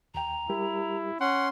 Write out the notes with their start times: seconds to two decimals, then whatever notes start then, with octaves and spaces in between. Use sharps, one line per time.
0.14 D#2 G5 A#5
0.49 G3 E4 G4 A#4
1.20 C#4 F#5 C6